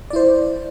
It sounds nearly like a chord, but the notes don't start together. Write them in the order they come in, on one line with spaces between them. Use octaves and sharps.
D5 E4 C5